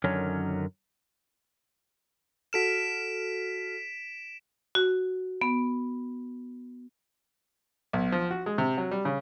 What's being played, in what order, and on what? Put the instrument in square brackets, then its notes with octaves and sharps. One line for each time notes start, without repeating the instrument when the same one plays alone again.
[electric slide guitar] F#2 D3 D#3 F#3 C#4
[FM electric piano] F#4 A4 F6 [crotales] B6 D7 E7
[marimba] F#4
B3
[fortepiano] B1
F3
F#4
G#3
C3
F#3
G3
C#3